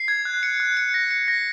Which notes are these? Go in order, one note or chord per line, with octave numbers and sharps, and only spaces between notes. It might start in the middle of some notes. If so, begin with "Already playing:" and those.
Already playing: C7
G#6
F#6
C#7
F#6
C#7
A#6
C#7
A#6